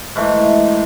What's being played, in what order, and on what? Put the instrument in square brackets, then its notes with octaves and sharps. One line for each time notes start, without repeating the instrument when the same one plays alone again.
[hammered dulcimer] G#2 E3 A3